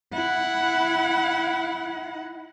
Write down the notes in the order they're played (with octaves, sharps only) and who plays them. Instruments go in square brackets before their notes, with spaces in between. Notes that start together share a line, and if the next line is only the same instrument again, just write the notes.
[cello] E4 F#5